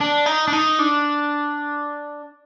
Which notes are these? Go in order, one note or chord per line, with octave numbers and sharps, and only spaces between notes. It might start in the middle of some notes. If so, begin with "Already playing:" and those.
D4
D#4
D4
D#4
D4